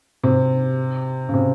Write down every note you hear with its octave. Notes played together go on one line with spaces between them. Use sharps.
C3
C#3
C3